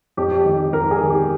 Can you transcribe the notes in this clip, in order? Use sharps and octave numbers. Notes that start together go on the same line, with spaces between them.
F2 G4
G4
D#3 G#3
F2 A#4
G#4
D#3 G#3
G4